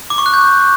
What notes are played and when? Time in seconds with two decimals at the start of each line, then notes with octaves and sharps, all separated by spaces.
0.10 D6
0.18 C#6
0.26 F#6
0.34 G6